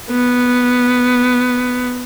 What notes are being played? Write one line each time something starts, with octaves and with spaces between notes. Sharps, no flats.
B3